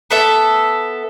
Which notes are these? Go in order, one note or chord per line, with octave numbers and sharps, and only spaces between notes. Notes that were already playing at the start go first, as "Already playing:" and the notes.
B3 A4 E5